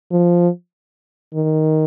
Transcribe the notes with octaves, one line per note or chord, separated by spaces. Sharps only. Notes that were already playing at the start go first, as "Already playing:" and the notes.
F3
D#3